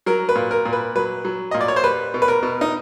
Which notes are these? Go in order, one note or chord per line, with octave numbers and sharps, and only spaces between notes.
F#3 A#4
B4
A#2
A#4
A#2
B4
F#3 B4
F#3
A#2 D#5
D5
C#5
C5
G3 B4
B2
B4
A#4
B2
D#4